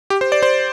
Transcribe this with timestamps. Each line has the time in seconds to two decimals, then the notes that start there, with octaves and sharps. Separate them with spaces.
0.10 G4
0.21 C5
0.32 D5
0.43 C5